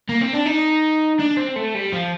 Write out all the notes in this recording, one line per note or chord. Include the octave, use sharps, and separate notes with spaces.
A#3
C4
D4
D#4
D4
C4
A3
G3
F3